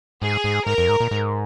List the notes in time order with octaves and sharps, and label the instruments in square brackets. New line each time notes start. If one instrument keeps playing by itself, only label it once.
[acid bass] G#2 [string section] G#4
[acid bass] G#2
[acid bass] G#2 [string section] A#4
[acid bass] F2
G#2
A#2
G#2